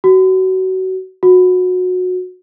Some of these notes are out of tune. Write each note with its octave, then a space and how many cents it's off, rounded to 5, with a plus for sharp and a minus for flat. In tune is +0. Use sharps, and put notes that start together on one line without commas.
F#4 +25
F#4 -20